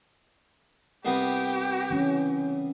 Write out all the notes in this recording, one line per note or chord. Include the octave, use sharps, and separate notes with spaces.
C2 C3 B3 G4
E3 C#4